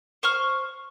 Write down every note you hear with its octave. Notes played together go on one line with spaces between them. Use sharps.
C5 C#6 F6